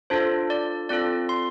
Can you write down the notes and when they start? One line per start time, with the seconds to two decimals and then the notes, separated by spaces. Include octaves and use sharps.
0.10 D4 F4 A4 C5
0.50 D5
0.89 C4 F4 A4 D5
1.29 C6